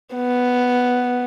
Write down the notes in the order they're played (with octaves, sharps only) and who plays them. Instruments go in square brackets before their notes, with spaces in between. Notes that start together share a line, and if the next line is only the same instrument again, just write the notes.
[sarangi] B3